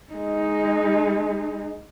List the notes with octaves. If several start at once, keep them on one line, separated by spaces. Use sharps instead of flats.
G#3 D#4